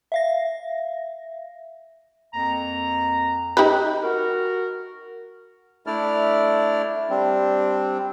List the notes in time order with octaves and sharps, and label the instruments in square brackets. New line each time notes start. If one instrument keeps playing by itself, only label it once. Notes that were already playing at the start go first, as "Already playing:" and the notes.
[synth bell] E5 F5 A#6
[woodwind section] F2 A#3 A#5
[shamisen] D#4 G4 B4
[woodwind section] F#4 A#4
[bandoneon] A3 D4 E4 D5 F6
G3 C4 D4